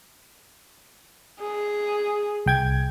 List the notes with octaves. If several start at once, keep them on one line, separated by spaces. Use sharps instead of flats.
G#4
C2 G5 G#6